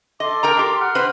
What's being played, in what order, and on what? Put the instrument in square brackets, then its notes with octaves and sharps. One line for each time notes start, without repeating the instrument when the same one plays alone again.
[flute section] A4 C6 D6 [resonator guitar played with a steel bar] D#5
[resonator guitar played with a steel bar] A#4 G5 A#5
G4
[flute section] F#5 F6
[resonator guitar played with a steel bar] C4 B4 C5